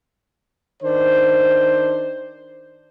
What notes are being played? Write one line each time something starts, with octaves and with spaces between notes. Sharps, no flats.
D#3 D4 C5